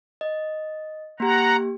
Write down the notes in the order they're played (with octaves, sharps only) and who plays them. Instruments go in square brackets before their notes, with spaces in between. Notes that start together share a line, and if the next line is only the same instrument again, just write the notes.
[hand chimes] D#5
[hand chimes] A#3 G4 [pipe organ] F#5 A#5